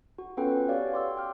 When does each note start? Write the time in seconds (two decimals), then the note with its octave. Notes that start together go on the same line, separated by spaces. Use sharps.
0.18 F#4
0.37 B3 C#4 F4 A4 B4 G5
0.68 F#4 G4 C#5 D5 F5
0.92 G5 C6 D6 E6
1.17 G5 F6